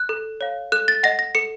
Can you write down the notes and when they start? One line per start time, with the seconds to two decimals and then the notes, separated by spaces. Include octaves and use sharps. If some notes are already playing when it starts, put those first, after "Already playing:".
Already playing: F#6
0.09 A4
0.41 C#5 F5
0.72 A4 F#6
0.88 A6
1.03 D#5 F#5 A#6
1.19 A#6
1.35 A4 C#7